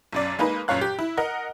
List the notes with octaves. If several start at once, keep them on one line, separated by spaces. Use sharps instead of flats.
B1 F#2 D5
G#3 A#3 D#4 B4
G1 F#2 A#2 C#5 F5 F#6
G4
E4
A#4 D#5 F#5